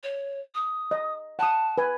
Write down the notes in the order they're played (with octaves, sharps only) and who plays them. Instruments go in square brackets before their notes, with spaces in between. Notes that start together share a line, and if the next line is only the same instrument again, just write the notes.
[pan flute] C#5
D#6
[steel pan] D#5
[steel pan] F#5 D#6 [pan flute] A5
[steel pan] B4 G#5